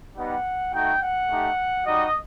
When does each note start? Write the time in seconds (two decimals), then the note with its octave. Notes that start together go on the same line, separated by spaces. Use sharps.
0.15 G3 B3 D#4 G4 F#5
0.73 A3 D#4 F#4 G5
1.01 F#5
1.29 A3 D#4 G4
1.86 G3 D#4 F#4 D#5